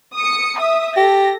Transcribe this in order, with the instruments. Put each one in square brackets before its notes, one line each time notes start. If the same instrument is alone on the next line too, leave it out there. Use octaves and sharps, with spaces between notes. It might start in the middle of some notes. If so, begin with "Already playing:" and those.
[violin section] D#6 C#7
E5 D#6
[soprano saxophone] G4 [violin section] A4 A#6